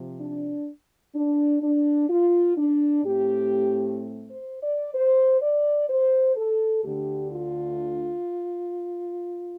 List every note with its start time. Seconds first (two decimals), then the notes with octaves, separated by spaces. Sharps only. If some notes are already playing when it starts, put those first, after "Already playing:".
Already playing: C3 F3
0.20 D4
1.14 D4
1.62 D4
2.09 F4
2.57 D4
3.04 A2 A3 C4 G4
4.31 C5
4.62 D5
4.94 C5
5.41 D5
5.89 C5
6.36 A4
6.83 D2 D3 A3 D4 G4
7.31 F4